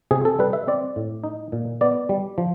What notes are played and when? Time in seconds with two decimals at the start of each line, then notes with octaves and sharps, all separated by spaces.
0.11 C3 G#4
0.25 A4
0.39 G3 B4
0.53 E5
0.67 C4 D5
0.96 A2
1.24 D#4
1.52 A#2
1.81 B3 D5
2.09 G3
2.38 F3